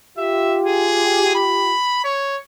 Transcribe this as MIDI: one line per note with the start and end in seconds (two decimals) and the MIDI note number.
0.18 1.73 65
0.18 1.73 67
0.18 0.58 76
0.66 1.33 68
1.35 2.03 83
2.04 2.37 73